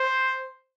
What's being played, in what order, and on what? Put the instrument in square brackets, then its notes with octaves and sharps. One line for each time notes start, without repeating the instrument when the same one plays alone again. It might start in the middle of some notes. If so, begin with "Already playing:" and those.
Already playing: [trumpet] C5